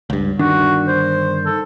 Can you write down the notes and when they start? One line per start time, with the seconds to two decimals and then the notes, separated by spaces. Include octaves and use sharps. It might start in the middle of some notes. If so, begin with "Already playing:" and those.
0.10 C#2 G2
0.39 G1 D#3 D4 F#4
0.88 C5
1.46 A4